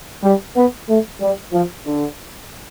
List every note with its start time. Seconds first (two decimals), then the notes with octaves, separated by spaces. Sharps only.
0.23 G3
0.55 B3
0.88 A3
1.20 G3
1.52 F3
1.85 D3